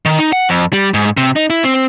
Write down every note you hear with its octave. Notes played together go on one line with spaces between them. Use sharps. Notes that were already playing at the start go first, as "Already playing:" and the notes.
D#3
D#4
F#5
F2
G3
G#2
C3
D#4
E4
C4